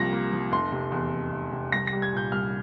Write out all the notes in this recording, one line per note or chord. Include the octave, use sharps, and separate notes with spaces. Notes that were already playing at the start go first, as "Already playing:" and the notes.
Already playing: C2 C3 F3 A#3 A#6
A#3
F3
F1 C6
C3
E2
F1
F1
C3
C2 A#6
A#6
G3
G#6
A#2 G6
C2 F6